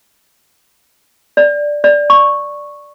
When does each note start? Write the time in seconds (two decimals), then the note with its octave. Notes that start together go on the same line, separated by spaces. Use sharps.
1.37 D5
1.84 D5
2.10 C#6